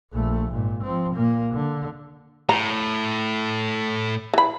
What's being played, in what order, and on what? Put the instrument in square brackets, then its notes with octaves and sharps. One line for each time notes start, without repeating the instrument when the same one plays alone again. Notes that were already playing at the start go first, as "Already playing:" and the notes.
[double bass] A#1 A3
G#1 A#2
F3 C4
A#2 A#3
D3
[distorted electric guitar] A2 [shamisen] A#5
[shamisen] E3 B5